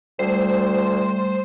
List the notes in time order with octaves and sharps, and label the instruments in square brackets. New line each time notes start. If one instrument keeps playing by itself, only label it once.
[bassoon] D2 [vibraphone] G3 A3 [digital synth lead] C5